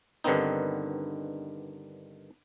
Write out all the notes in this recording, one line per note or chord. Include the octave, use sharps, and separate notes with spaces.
G2 D3 D#3 B3 C4 D#4